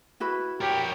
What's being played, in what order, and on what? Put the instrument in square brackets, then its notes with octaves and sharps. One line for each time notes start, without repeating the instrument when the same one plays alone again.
[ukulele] E4 F#4 B4
[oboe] G4 [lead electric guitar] A#4 C#5